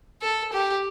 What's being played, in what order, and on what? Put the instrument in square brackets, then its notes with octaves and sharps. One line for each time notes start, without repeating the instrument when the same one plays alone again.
[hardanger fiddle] A4
G4